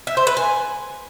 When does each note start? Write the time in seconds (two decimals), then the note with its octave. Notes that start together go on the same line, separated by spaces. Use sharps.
0.07 E5
0.17 C5
0.27 B4
0.37 G#5